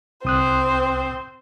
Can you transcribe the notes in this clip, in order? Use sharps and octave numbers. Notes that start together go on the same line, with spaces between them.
C2 C4 C5 D#6 F#6